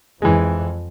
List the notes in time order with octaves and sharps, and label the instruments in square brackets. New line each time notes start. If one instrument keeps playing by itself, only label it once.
[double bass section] F2 [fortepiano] E3 G#3